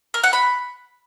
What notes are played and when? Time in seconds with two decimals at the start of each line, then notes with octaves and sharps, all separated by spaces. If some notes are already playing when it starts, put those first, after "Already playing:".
0.14 A#4
0.23 F#5
0.33 B5